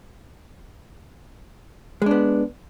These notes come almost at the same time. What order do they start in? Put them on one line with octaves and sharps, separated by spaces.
G#3 D4 B3